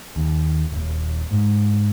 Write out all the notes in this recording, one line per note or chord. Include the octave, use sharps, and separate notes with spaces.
D#2
D#1
G#2